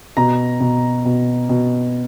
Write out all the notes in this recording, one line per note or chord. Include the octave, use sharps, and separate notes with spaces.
B2 A#5
B2
B2
B2